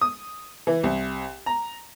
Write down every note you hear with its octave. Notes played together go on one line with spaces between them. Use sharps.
D#6
E3
C2
A#5